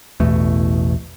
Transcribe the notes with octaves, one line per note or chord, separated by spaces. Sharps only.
A1 E2 B2 A3